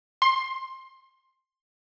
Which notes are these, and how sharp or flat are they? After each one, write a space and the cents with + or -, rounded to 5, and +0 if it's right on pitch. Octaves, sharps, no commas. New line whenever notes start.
C6 +20